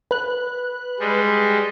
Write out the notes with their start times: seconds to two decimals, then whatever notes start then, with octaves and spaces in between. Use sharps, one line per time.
0.11 B4 F#6
1.00 G3 G#3